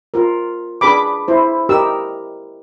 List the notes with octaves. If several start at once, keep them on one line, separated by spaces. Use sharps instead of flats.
F4 A#4
D4 G#4 B4 B5 D6
E4 C5
D#4 G4 A#4 E6